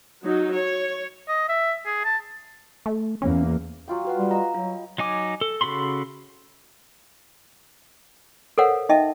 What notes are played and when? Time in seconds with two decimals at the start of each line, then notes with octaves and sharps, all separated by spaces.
0.23 F#3 D#4
0.54 C#5
1.28 D#5
1.49 E5
1.85 G#4
2.05 A5
2.86 A3
3.22 E2 A#3 C#4
3.88 F#3 F4 G5
4.05 F#4 B4 F#5
4.17 G3
4.31 D#5 F5 A#5 E6
4.54 F#3 F4
4.98 F#3 D#4 G#5 D6
5.41 A4
5.61 C#3 F#4 A4 B5 C6
8.58 A4 A#4 C5 C#5 F5 F#5
8.89 D#4 D#5 E5 G5 A5